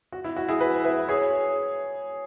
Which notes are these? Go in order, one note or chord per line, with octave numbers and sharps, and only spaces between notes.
F#4
E4
F#4
E4 G#4
F#4 B4
B4 E5
G#4 C#5